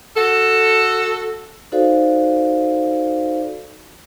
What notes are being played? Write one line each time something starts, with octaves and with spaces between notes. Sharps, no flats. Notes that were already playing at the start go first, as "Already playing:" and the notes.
F#4 A4
D#4 F#4 A4 C5 D5 F5